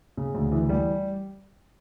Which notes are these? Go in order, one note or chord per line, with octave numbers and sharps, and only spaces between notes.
C#3
D2
E3
G3